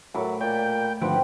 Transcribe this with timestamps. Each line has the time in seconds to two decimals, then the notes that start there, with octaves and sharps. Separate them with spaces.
0.14 A2 F#3 A4 A#4 E5 B5 D6
0.41 A#2 C#5 D5 G5
1.01 G#1 D3 F3 G3 C4 B4 F#5 D7